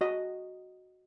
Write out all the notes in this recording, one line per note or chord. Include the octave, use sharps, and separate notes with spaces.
F#4 D#5